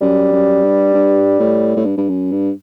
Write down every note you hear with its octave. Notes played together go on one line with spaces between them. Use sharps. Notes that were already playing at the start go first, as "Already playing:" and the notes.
F#2 G3
F#2
G2
G2
A2
A2
G2
G2
F#2
G2